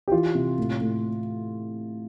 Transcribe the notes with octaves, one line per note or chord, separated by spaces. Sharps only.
G4
E3 F4
C3
A2
A2